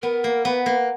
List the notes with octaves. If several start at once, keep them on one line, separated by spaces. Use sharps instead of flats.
B3 A#4
A#3
B3 B4
A#3